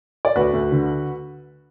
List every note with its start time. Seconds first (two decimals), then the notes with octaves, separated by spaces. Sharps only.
0.25 D5
0.36 D2 F#4 B4
0.53 D2
0.72 D3